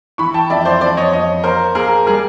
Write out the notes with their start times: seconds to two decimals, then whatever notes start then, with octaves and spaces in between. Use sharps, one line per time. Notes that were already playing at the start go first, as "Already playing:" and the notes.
0.18 E3 B5 C#6
0.34 G5 A5
0.50 F2 D5 E5
0.65 C5 D5
0.81 F2 C5 D5
0.97 C#5 D#5
1.13 F2 C#5 D#5
1.44 A#3 A#4 C5
1.75 A#3 G#4 A#4
2.06 G3 G#4 A#4